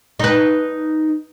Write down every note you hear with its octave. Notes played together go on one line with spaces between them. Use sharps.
D#4 B4